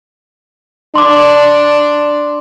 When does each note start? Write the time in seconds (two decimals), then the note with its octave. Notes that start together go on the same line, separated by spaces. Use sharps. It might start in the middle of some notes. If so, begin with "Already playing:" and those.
0.95 D4 C6 D6